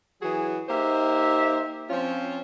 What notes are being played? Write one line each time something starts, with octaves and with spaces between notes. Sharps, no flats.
E3 F#3 F#4 G#4
A#3 D#4 G4 C5 E5
F3 C4 C#4 F4